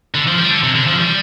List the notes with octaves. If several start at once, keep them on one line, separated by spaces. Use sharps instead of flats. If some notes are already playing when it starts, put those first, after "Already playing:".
D3
F3
G3
D3
C3
D3
F3
G3